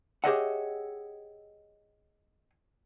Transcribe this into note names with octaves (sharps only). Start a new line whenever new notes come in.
G4 G#4 C#5 D#5 E5 F#5